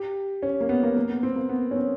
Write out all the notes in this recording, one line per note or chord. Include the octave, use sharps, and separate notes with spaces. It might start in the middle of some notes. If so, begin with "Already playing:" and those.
Already playing: G4
C#4
A#3
B3
A#3
A#3
B3
C4
A#3
B3
C#4
C4